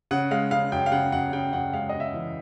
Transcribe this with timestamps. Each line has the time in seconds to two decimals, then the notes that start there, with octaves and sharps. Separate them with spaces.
0.11 C#3 F#5
0.31 G#3 F5
0.51 C#3 F5
0.72 F#2 G5
0.86 F5
0.92 C#3 F#5
1.12 F#2 F#5
1.33 C#3 G5
1.53 F#2 F#5
1.73 G#3 F5
1.89 C#3 D#5
2.00 E5
2.14 E3